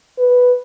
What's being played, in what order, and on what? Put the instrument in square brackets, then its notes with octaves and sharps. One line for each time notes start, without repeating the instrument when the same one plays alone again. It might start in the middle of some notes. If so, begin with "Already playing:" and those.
[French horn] B4